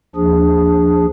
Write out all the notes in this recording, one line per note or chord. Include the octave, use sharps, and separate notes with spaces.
D#2 F3 D4 G#4